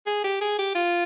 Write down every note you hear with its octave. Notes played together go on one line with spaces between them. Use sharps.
G#4
G4
G#4
G4
F4